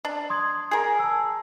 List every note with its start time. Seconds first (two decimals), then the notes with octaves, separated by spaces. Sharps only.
0.05 D4
0.30 C6 D#6 G#6
0.71 G#4 A#4
0.99 A5 E6